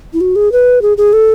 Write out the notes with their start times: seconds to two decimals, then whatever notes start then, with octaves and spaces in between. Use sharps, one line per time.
0.13 E4
0.21 F#4
0.36 G#4
0.52 B4
0.82 G#4
0.98 G#4
1.13 A4